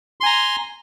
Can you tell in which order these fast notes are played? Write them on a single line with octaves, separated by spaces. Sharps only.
C6 G#5 A#5